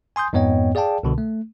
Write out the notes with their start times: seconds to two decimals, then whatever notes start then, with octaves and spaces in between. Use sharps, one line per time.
0.16 G#5 C6 D#6 G6
0.33 F2 G#2 B3 C#5 D#5 G5
0.75 G#4 D5 F5 G5 A5
1.03 C2 B2 D3
1.18 A3